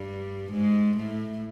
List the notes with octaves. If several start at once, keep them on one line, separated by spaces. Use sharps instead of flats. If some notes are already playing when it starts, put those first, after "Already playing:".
Already playing: G2 G3
G#2 G#3
A2 A3